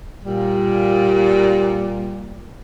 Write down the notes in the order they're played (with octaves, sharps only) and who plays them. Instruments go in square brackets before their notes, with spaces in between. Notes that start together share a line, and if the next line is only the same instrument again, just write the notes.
[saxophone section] A#2 G3